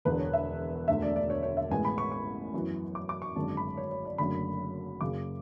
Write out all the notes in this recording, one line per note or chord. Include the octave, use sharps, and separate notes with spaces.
E1 E2 D3 B4
C#5
E5
E1 D2 D3 A3 E5
D5
D5
C#5
C#5
E5
A1 A2 G#3 B3 G#5
B5
C#6
C#6
F#2 E3 B3
D6
D6
C#6
G#1 F#2 D3 G#3 A5
B5
C#5
C#5
D5
F#1 F#2 D3 A3 B5
F#1 F#2 C#3 D6